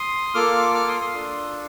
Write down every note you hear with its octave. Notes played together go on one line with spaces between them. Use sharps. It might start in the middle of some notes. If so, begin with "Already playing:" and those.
Already playing: C6 D#6
A#3 F4 A4 D6 F6
D6 F6
C6 D#6
C6 D#6
D4 F4 A4